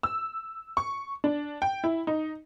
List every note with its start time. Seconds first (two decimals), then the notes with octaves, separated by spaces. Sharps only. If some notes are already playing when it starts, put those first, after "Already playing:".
0.03 E6
0.77 C#6
1.24 D4
1.62 G5
1.84 E4
2.07 D#4